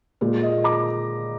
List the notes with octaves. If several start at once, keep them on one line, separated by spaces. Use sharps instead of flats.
A#2 G#3
D#5
A#5 D6